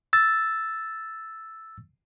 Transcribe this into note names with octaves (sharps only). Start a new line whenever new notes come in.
E6 A6